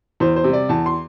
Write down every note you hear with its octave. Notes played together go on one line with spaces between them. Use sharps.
E2 C5
C5
C3 G3
D5
E2 A5
C6